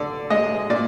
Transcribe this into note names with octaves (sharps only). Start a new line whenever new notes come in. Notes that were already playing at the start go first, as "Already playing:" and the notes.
Already playing: D3 D5
G#3 D#5
A#2 D5